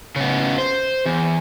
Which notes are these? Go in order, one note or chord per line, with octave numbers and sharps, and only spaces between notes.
C#3 B3
C5
E2